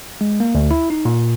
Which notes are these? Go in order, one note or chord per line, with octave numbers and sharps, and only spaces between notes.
G#3
A#3
D2
E4
D#4
A#2